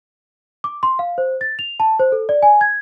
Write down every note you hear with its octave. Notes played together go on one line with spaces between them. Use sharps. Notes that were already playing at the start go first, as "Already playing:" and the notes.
D6
C6
F5
C5
A6
F7
A5
C5
A4
D5
G#5
G#6